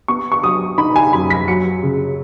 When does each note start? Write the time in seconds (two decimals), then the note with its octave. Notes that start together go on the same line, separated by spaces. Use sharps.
0.08 B3 C#6
0.32 C#6
0.44 F#3 D#6
0.78 D#4 B5
0.96 G#5
1.13 F#2 B5
1.30 B6
1.48 F#3 C#7
1.83 C#3